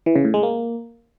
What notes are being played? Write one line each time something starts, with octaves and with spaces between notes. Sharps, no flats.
E3
C#3
A2
G#3
A#3